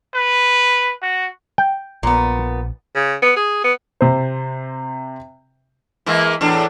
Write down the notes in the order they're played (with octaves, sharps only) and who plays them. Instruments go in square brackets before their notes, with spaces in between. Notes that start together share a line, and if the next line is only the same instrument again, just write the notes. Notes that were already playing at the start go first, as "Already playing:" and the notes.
[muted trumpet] B4
F#4
[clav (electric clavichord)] G5
[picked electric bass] A#1 [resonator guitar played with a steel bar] A#2 B3
[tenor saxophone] C#3
B3
G#4
B3
[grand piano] C3 C5
[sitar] E3 G#3 A#3
E2 A2 D4